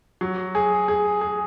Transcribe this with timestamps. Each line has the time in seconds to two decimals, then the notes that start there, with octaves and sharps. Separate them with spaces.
0.21 F#3
0.55 G#4
0.88 G#4
1.21 G#4